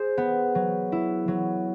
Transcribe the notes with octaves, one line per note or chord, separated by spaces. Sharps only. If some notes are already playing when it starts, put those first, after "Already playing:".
Already playing: G#4 C5
B3
F#3
E4
F#3